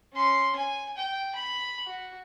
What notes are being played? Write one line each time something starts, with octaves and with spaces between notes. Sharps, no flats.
C#4 C6
G#5
G5
B5
F#4